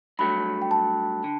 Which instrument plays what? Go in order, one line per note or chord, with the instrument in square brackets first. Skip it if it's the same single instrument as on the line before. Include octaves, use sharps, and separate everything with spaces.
[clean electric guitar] G2 F#3 A3 [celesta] B5
[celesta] G5
A5
[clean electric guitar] D3